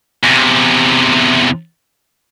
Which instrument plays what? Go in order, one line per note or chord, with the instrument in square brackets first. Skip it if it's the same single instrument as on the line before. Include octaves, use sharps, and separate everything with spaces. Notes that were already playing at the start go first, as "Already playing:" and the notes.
[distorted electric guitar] E2 C3